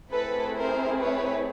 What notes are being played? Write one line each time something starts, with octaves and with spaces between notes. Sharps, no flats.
A3 C4 E4 G#4 A4 B4
A#4 C5
B4 C#5